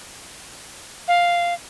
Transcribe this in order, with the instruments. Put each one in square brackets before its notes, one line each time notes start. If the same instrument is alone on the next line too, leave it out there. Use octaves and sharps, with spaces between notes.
[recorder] F5